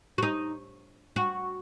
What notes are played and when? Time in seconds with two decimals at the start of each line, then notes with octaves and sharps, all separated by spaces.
0.18 F#4
0.23 D#4
1.16 F#4